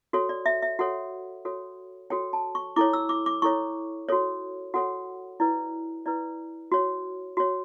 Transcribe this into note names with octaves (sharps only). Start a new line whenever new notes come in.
F#4 A4 C#5
D5
E5
E5
F#4 A4 C#5 F#5
F#4 A4 C#5
F#4 A4 C#5 G5
A5
C#6
E4 A4 C#5 D6
E6
D6
D6
E4 A4 C#5 C#6
F#4 A4 C#5
F#4 A4 C#5 F#5
E4 B4 D5
E4 B4 D5
F#4 C#5
F#4 C#5